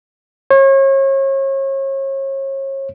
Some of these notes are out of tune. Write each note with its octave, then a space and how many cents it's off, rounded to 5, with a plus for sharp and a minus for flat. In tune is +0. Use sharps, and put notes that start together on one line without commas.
C#5 -35